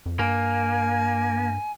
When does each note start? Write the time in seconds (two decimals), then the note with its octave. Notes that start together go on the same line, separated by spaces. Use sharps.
0.06 F2
0.19 G2 A#3 G#5